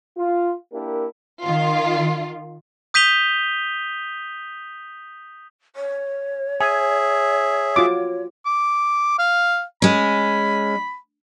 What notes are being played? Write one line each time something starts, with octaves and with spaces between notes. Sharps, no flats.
F4
A#3 D4 E4 G4 A#4
D#3 F4
D#6 G6 B6 D#7 F7 G7
C#5
G#4 E5 G#5
F4 F#4 D6
D6
F5
G#3 C#4 B5